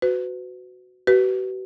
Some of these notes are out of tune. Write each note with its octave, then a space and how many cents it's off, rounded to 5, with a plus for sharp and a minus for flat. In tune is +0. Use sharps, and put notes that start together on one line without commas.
F#4 +0 B4 +30
F#4 +45 B4 +0